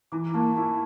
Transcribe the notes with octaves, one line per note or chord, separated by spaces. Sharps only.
E3 A#5 D6
A#3 A5 C#6
E4 A5 C#6